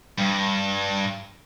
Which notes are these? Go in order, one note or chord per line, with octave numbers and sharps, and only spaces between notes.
G2